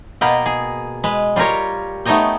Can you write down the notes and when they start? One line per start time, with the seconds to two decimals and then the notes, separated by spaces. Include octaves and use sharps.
0.21 B2 A#3 B3 A#4 B4 G5
0.46 G#4
1.04 G#3 B4
1.36 G3 F4 G4 A#4 C#5
2.05 A3 B3 D#4 C#5 D#5 G5